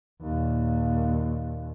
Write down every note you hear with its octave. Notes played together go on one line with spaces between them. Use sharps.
D#2 A#2